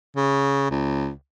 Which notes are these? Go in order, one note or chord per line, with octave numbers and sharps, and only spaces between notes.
C#3
C#2